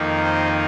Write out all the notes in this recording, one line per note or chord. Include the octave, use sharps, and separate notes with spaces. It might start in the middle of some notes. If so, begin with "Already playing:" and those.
Already playing: F2 D#3 A#3 D#4
C5